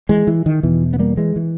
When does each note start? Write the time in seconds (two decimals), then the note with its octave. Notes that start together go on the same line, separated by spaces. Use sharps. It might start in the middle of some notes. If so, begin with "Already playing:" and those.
0.09 E3 G#3
0.27 E3
0.46 D#3
0.63 E2 B2 E3
0.93 B3
0.99 G3 A#3
1.17 E3 G#3
1.36 E3